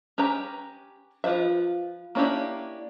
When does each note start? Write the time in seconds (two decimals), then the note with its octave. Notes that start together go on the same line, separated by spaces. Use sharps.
0.18 C#4 G4 B4 A#5
1.24 F3 F4 B4 C5 E5
2.15 A#3 C#4 D4 E4 G4